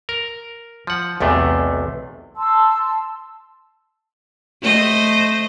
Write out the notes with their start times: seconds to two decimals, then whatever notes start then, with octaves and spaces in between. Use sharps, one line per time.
0.09 A#4
0.87 F3 F#5
1.20 B1 E2 C3 A3
2.37 A5 C6 E6
4.62 A3 C5 D#5